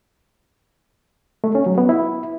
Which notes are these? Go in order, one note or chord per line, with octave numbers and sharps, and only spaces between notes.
A3
C#4
F#3
B3
E4